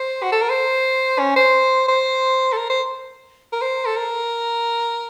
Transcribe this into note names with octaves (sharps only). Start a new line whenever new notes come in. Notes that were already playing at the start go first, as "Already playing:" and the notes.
Already playing: C5
F#4
A4
A#4
C5
C#4
C5
C5
A4
A#4
C5
A#4
C5
A4
A#4